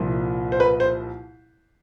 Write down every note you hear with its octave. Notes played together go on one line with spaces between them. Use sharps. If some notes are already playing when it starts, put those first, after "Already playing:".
Already playing: C2 A#2 F3
C5
B4
C5